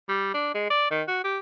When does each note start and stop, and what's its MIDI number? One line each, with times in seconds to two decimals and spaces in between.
0.09 0.33 55
0.34 0.50 62
0.55 0.66 56
0.70 0.90 74
0.91 1.03 51
1.08 1.20 66
1.24 1.39 67